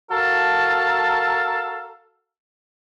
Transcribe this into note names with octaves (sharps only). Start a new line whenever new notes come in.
F#4 A4 A#4 F5 A5